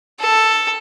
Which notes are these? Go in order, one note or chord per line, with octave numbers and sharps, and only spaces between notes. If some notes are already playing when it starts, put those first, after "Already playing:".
A4